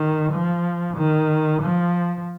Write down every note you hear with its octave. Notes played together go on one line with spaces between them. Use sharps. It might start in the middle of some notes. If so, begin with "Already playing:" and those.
Already playing: D#3
F3
D#3
F3